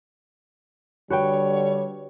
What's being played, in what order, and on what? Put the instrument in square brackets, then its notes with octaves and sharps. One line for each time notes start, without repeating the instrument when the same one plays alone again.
[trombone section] D3 G3 [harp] F#4 B4 G5 [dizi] C#5